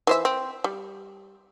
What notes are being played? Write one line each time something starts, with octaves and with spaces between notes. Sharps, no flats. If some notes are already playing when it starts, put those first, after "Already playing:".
E3 C5 E5
C4
G3